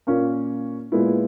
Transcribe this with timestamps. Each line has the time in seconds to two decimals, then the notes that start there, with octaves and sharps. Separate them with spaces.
0.07 A#2 A#3 C#4
0.92 A#2 G#3 B3 E4